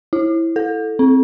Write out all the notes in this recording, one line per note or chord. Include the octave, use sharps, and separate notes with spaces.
E4
A4
C4